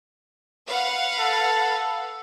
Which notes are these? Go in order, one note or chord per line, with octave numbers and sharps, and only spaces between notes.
B4 F5 F#5
A4